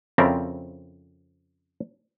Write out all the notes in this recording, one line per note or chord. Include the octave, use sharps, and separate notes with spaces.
F2 C#3 C4 E4 A#4 D5